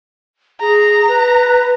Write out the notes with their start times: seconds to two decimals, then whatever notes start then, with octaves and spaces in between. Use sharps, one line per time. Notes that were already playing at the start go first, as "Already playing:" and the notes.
0.61 G#4 A#5
1.08 B4